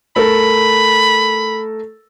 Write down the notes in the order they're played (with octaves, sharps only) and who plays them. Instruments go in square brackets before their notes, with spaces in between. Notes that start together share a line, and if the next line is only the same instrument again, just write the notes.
[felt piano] A3 A4 A#4 [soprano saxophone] B5